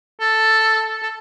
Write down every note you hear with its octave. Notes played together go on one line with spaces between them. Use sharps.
A4
A4